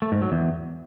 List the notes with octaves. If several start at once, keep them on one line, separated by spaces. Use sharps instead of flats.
A3
G#2
F#3
E2